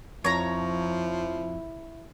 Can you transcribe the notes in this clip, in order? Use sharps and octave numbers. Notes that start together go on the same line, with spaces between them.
F2 F3 E4 C#5 A#5